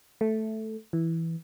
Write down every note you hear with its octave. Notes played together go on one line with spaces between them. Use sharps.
A3
E3